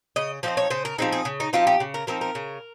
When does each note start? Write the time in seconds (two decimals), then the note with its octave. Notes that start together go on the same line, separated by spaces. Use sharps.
0.16 C#3 D#5
0.43 F3 C4 D#4 C5
0.57 C#5
0.70 C#3 C5
0.85 A#4
0.98 F3 C4 D#4 G#4
1.12 G#4
1.25 C#3
1.40 D#4
1.53 F3 C4 D#4 F4
1.67 G4
1.80 C#3
1.94 A#4
2.07 F3 C4 D#4 A#4
2.21 A#4
2.35 C#3